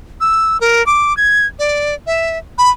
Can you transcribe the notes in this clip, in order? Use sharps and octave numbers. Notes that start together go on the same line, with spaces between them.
E6
A#4
D6
G#6
D5
E5
B5